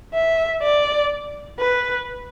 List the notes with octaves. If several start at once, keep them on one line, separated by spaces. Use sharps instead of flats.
E5
D5
B4